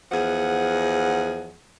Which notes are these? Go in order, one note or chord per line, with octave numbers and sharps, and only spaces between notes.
E2 F3 G#4 F#5